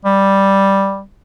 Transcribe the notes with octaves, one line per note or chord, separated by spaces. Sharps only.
G3